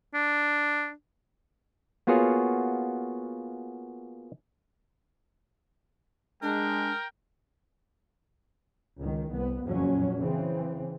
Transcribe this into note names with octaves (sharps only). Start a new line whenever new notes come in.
D4
A#3 B3 F4 F#4 G#4 C#5
G#3 D4 A#4 G5
C#2 D#3
C2 B3
F#1 F2 A#2 F3 F#3 C#4
C#3 E3 C4